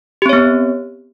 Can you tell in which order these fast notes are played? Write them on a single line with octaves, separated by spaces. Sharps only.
G4 C4 C#5 B3